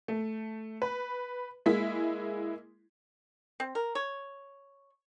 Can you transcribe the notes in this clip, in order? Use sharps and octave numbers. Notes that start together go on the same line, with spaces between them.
A3
B4
G#3 A#3 E4 B6
C4
A#4
C#5